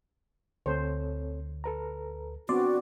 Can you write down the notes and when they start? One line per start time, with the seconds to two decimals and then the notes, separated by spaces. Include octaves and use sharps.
0.66 D2 C4 A4 C5 C#5
1.64 A4 B4 A#5
2.49 B3 C4 D4 F#4 D5 C6